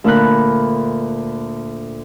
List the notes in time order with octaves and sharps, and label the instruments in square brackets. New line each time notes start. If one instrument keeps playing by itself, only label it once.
[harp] D2 A#2 D4 A#4 B5 F#6